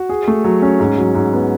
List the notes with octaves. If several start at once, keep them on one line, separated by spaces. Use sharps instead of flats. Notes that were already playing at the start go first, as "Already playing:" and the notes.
Already playing: F#4
G#4
A3
F#3
C#4
G#2
F#3
G#2
B3